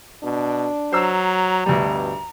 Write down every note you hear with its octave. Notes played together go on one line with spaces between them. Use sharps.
B2 D4
F#3 C5 A#5 E6
D2 G2 B2 G3